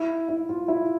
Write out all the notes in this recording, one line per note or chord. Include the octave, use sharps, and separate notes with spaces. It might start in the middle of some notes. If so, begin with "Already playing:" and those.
Already playing: E4
E4
F4
E4